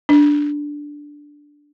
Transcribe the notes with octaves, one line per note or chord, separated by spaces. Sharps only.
D4